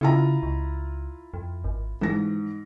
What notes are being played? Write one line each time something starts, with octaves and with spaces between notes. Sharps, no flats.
C#3 E4 F4 A#5
C#2
F2
G#1
G#2 E3 A#6